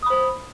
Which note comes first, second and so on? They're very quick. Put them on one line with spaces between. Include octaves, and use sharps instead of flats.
D#6 B5 C5